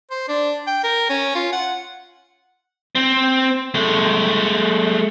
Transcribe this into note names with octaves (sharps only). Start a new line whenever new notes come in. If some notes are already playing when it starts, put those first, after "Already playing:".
C5
D4
G5
A#4
C#4
F4
F#5
C4
G#3 A3